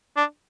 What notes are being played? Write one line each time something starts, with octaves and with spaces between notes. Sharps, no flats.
D4